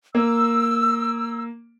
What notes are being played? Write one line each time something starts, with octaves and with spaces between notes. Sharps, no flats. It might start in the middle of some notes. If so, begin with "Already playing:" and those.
A#3 E6